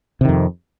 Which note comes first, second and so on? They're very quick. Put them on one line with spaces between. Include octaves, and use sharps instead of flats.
C3 D#3 F2